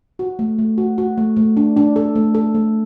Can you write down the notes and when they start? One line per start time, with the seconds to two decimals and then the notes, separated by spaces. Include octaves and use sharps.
0.19 F#4
0.39 A3
0.58 A3
0.78 F#4
0.98 F#4
1.18 A3
1.37 A3
1.57 D4
1.77 D4
1.96 A4
2.15 A3
2.35 A4
2.55 A3